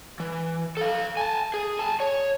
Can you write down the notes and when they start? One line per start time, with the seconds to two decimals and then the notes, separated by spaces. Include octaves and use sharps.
0.20 E3
0.77 A4 F5
1.17 G#5 A5
1.54 G#4
1.79 G#5 A5
2.00 C#5